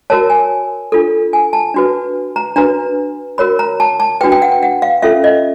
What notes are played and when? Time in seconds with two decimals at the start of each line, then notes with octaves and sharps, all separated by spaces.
0.10 F#4 A#4 C#5 A5
0.30 G#5
0.92 D4 F4 A4
1.33 G#5
1.53 A5
1.74 D4 F#4 B4
2.36 A#5
2.56 D4 F#4 B4 A#5
3.38 F#4 A#4 C#5 B5
3.59 A#5
3.80 A5
4.00 A5
4.21 D4 F#4 B4 G5
4.32 G5
4.42 F#5
4.52 G5
4.63 F#5
4.82 F5
5.02 C#4 F4 A4 E5
5.24 D#5